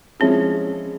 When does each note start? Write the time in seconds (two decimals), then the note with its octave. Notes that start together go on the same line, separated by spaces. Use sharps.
0.20 F3 G#3 C4 C#4 E4